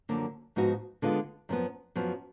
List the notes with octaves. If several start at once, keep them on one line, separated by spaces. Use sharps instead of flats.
F#2 D3 F3 A#3
G#2 F3 B3 D#4 F#4
D3 G#3 B3 F4
F#2 F3 B3
F#2 F3 B3